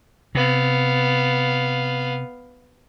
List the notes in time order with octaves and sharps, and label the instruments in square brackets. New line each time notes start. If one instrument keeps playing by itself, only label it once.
[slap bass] C3 [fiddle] B3 F5